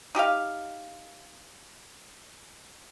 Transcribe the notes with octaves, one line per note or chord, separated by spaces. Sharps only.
D#4 G4 D#5 F5